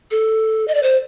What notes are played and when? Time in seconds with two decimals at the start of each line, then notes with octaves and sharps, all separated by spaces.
0.11 A4
0.68 D#5
0.75 D5
0.83 C5